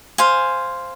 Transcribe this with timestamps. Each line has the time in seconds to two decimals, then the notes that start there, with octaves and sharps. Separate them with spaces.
0.18 C5 F5 G#5